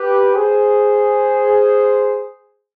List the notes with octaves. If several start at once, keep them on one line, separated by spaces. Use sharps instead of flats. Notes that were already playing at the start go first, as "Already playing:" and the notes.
Already playing: G4 B4
G#4 C5